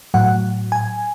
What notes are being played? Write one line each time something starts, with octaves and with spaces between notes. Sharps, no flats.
A2 F#3 F#5
G#5